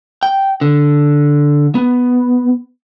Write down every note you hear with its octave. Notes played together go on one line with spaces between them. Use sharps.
G5
D3
B3